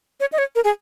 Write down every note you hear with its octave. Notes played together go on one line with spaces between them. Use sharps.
C#5
D#5
C#5
A#4
G#4